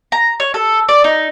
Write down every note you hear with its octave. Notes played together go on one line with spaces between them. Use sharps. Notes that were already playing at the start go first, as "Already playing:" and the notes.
A#5
C#5
A4
D5
D#4